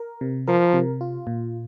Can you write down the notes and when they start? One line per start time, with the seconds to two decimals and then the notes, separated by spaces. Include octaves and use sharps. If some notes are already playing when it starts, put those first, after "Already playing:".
Already playing: A#4
0.21 C3
0.48 F3 A#4
0.74 C3
1.01 F4
1.27 A#2